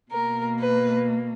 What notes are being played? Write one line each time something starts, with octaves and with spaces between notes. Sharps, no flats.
B2 A#3 A#4
B4